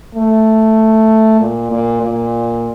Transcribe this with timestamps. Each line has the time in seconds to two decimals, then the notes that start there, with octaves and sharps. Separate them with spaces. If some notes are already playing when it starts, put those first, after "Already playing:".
0.15 A3
1.41 A#2
1.71 A#2
2.03 A#2